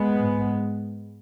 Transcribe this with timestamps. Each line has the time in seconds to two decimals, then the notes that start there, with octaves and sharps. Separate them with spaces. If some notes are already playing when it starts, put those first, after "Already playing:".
Already playing: G#3 B3
0.17 G#2